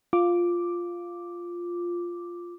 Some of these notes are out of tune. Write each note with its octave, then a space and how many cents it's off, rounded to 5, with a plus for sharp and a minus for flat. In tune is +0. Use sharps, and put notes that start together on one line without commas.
F4 +0 D6 +0